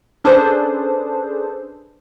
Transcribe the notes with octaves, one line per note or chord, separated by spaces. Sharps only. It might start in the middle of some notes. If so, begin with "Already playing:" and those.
C#4 D4 G#4 A4 B4 C5